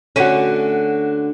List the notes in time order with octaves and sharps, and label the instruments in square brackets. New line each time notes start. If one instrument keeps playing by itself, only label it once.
[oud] D3 A3 C#4 [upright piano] F#4 D#7